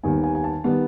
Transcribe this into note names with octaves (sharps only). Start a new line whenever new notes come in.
D#2 D#3 G3 B3 G#5
G#5
G#5
A5
D#3 G3 B3